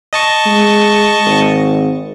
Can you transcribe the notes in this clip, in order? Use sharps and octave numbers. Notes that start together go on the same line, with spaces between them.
D#5 A5 C#6
G#3
G#1